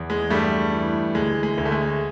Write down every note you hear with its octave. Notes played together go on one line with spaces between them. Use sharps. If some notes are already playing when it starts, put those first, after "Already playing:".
Already playing: E2
G#3
G2 G3 A3
E3
D2 G#3
G#3
D2
A3
G#3